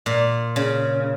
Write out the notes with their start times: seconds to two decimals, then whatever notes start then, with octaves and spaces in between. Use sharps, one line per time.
0.06 A#2
0.56 C#3